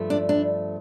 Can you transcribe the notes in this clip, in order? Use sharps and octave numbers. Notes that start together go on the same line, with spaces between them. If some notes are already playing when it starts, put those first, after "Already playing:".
Already playing: G2 F3 A3
D4
D4